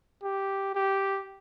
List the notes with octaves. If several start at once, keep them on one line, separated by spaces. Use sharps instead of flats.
G4
G4